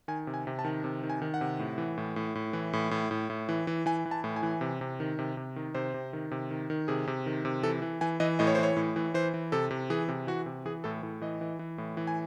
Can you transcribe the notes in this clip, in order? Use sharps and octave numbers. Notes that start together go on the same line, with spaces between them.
D#3 G#5
C3
G#5
C3
A5
D#3
C3
D#3
G#5
D#3
F#5
C3
A2
E3
A2
A2
A2
E3
A2
A2
A2
A2
E3
E3
E3 G#5
E3
A5
A2
G#5
E3
C3
C3
D#3
C3
C3
D#3
C3 C5
C3
D#3
C3
D#3
D#3
C3 G#4
C3
D#3
C3
E3 A4
E3
E3 G#5
E3 D#5
A2 D#5
C#5
C5
E3 C#5
A2
E3
E3 C5
E3
C3 A4
C3
E3 G#4
C3
E3 F#4
C3
E3 G#4
A2 A4
A2
E3 D#5
E3
E3
A2
E3
G#5